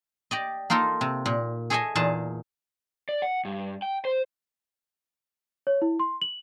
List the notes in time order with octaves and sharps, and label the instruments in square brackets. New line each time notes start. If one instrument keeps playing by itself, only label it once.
[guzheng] G4 D5 D#5
A#3 D#4 F4 A4 A#4
C3
A#2
G#4 A4 C#5 D#5 E5 G#5
E2 A#2 D#4 G#4 A5
[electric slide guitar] D5
F#5
G2
G5
C5
[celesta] C#5
E4
C6
F#7